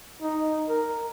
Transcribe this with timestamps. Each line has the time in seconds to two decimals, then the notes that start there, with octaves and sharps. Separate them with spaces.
0.22 D#4
0.69 A#4